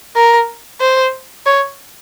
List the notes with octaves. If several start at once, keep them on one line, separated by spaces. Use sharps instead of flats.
A#4
C5
C#5